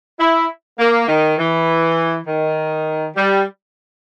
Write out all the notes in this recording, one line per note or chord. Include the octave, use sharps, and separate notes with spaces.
E4
A#3
D#3
E3
D#3
G3